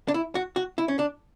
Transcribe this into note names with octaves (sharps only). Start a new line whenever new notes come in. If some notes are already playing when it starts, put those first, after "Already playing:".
D4
E4
F#4
F#4
E4
C#4
D4